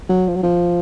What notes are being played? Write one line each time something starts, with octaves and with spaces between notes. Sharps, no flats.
F#3
F3
F#3
F3